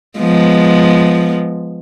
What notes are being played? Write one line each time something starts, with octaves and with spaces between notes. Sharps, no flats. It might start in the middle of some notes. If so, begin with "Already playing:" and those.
F3 G#3 B3